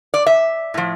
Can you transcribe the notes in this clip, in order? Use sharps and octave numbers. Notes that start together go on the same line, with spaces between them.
D5
E5
A2 F3